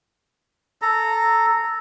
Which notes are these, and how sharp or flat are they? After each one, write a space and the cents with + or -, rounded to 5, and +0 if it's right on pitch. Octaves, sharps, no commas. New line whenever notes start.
A4 -5 A#5 -15